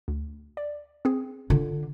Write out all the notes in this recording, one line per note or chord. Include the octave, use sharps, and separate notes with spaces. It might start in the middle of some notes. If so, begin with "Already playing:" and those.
D2
D5
C4 G#4
D3 F4